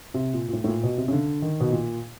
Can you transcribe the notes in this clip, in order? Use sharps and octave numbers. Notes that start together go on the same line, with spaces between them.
C3
A#2
A#2
A2
A2
A#2
B2
C3
C#3
D3
D#3
B2
A#2